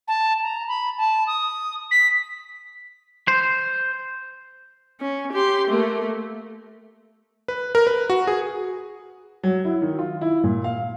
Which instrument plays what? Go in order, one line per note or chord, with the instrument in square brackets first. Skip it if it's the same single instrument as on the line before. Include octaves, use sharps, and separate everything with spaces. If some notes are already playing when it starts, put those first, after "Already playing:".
[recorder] A5
A#5
B5
A5
D#6
B6
[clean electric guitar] C5
[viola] C#4
G4 C6
A3 A#3
[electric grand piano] B4
A#4
B4
F#4
G#4
[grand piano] F#3
E4
D#3
F4
E4
A#2
F5